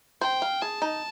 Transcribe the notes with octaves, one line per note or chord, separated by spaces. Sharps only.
C5 G5
F5
G#4 A5
D#4